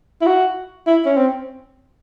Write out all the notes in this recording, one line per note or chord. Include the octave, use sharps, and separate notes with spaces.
E4
F#4
E4
C#4
C4